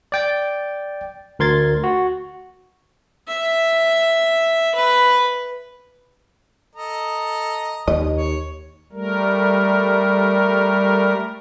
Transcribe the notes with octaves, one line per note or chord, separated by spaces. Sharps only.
D5 G5 A6
D2 A#4 C6 G#6 A6
F#4
E5
B4
A4 D#5 A#5
D#2 D#5
C#5
G3 A3 A#4